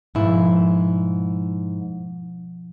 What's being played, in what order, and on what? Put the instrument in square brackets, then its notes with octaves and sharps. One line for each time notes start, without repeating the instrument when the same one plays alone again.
[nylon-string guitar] G#2 E4 [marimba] B2 F3